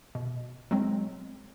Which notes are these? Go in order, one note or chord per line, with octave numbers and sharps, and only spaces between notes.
B2
F#3 G#3 C4